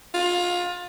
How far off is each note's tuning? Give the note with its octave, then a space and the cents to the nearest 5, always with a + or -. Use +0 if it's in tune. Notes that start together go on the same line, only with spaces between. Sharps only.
F4 +25